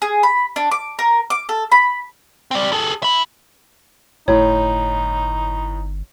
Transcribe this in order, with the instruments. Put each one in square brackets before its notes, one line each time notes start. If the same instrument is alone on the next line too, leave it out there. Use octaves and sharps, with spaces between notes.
[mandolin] G#4
B5
D4
D6
A#4
D6
A4
B5
[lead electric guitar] C4 D5
G#4 A4
E5 B5
[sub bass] G1 [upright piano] A2 [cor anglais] D#4 [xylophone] C#5